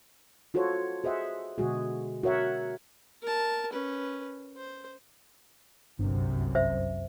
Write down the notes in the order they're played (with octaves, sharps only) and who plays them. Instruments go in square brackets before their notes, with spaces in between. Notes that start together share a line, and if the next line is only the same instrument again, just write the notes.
[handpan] F4 F#4 A4 C5 C#5
G#4 C5 D#5 E5 F#5
B2 D3 G#3 F#4 G#4
F#4 A#4 C#5 E5 F#5
[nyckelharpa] A#4 A5
C#4 B4
C5
[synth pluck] G1 [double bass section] C2 F#2 C3
[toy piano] C5 E5